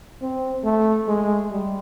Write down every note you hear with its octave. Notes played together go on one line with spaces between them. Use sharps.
C4
A3
G#3
G3